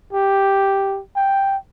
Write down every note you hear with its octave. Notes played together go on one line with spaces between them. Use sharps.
G4
G5